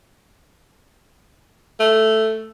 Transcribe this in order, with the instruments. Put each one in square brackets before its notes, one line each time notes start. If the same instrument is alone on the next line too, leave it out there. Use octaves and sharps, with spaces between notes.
[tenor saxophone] A3